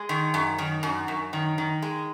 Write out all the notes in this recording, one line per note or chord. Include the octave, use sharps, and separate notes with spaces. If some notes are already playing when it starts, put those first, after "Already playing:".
Already playing: G#3
D#3
F#2
D#3
F#2
F#2
D#3
D#3
G#3